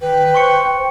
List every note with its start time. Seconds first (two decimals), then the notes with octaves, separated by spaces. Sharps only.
0.01 D#3 B4 G5
0.34 C5 C6 C#6 C#7